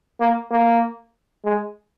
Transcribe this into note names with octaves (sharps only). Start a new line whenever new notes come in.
A#3
A#3
G#3